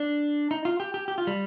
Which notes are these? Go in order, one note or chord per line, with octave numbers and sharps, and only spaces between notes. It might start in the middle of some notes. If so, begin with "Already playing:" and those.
Already playing: D4
D#4
F4
G4
G4
G4
F4
G3